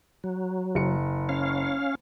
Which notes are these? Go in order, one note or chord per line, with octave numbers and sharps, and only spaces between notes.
F#3
F#1 C#7
C#4 F5